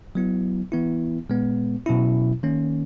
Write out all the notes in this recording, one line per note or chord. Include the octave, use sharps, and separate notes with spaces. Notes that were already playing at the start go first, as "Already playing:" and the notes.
F#3 B3 E4
E3 B3 E4
A#2 G#3 B3
B2 F#3 C#4 E4
D#3 A#3 C#4